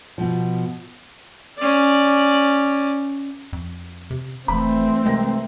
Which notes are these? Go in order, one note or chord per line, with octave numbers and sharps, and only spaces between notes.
B2 F3
C#4 D5
F2
C3
F1 E3 A3 C4 B5
C2 G#3 G5 A#6